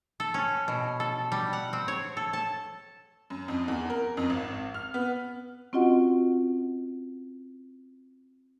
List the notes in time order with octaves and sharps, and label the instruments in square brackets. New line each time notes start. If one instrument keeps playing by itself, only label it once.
[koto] A4
C#4
B2
A4
G3
F#5
C4
C#5
A4
A5
[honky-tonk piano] F#2
F2
E2
A#4
F2
G#1
F6
B3
[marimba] C4 C#4 F4 F#4 D#5 F#5